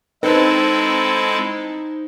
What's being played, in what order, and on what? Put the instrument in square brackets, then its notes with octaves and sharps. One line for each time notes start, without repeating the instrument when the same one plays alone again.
[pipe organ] G#3 E4 A4 [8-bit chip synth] C4 A5 [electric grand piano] D#4 C5 [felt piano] B4